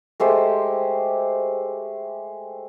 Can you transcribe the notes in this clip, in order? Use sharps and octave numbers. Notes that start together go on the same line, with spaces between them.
G#3 A3 G4 C5